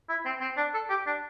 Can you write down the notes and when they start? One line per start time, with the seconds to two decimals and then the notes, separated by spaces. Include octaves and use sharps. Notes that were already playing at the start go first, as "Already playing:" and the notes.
0.09 E4
0.26 C4
0.41 C4
0.57 D4
0.74 A4
0.90 G4
1.06 D4